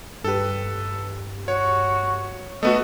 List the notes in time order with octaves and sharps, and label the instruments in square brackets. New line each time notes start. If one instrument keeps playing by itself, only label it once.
[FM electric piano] G2 G4 [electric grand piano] A4 B4
[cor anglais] F#4 [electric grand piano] C#5
[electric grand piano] A3 B3 F#4 [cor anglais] D#5